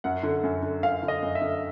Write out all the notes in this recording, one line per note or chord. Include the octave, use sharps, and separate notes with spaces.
F#2 F#5
D3
F#2
D3
F#2 F5
D3
D#5
F#2
E5
D3